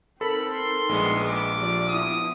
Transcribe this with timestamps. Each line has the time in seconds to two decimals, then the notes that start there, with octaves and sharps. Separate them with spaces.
0.21 C4 D#4 A4 A#4 B5
0.52 C6
0.89 A#1 G#3 B3
1.27 D6
1.57 F3 G4 D5
1.88 B3 E4 D#6